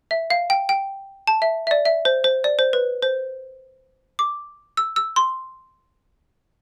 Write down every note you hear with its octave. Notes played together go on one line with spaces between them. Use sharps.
E5
F5
G5
G5
A5
E5
E5
D5
E5
C5
C5
D5
C5
B4
C5
D6
E6
E6
C6